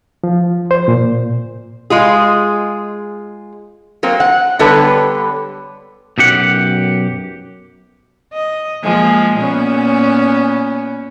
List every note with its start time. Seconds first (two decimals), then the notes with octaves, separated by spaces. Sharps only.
0.24 F3
0.71 C5
0.88 A#2
1.90 G#3 F4 G#4
4.03 F#3 A#3 C4
4.20 F#5
4.59 D3 G3 B3 A4 B4 C#5
6.18 B1 F#2 G4 F#5
8.33 D#5
8.84 F3 G#3 A#3
9.37 A#2 B3 C#4